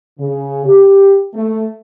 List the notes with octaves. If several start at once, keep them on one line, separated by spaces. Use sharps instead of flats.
C#3
G4
A3